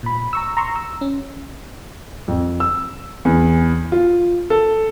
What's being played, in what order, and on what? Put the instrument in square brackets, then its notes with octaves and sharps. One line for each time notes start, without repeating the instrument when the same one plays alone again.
[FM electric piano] A#2 B5
A#5 C#6 E6
A#5 C6 C#6 E6
E6
C#4
[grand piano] F2
E6
E2
F4
A4